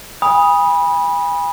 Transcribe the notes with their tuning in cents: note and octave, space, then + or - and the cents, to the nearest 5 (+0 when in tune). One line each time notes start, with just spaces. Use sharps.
G#5 -35 B5 -15 D#6 +0